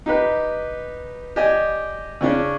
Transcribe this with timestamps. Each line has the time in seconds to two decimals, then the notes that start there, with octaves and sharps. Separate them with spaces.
0.06 D#4 G4 B4
1.36 G4 D5 D#5 G#5
2.21 C#3 C#4 D4